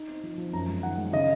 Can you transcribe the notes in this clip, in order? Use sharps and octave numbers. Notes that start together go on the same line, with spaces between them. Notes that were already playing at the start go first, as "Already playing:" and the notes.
Already playing: D#4
C4
F3
F3
F#2 A#5
G#3
D#3 F#5
G#3
C#3 D#5